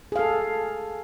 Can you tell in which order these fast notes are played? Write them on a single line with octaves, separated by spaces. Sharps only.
G#4 F5 A4